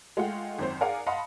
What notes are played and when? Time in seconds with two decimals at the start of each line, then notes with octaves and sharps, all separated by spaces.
0.17 G#3 A3 F4 F#5 G5
0.58 G#1 F#2 C4 C5
0.81 G#4 A#4 D5 F5 F#5 G#5
1.07 D#5 F5 F#5 A5 B5 C6